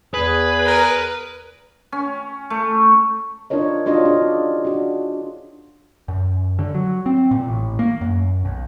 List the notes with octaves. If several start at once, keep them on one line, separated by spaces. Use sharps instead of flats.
E2 G#4 B4
A#4
C#4
A3
D4 F4 A#4 C#5 D#5
D4 D#4 F4 F#4 C#5 D#5
C#4 D4 G#4 D5
D4 F#4
F#2
D3
F#3
C4
A#2
A1
A#3
F#2
B1